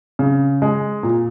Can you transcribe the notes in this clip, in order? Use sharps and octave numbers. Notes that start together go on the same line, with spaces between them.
C#3
G#3
A#2